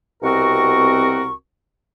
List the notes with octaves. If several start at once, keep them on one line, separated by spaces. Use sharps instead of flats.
C2 B2 C4 F#4 A#4 C#6